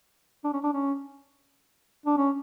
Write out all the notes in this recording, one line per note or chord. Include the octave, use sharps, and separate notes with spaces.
D4
C#4
D4
C#4
D4
C#4